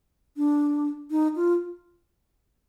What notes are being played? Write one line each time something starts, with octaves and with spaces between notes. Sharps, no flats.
D4
D#4
F4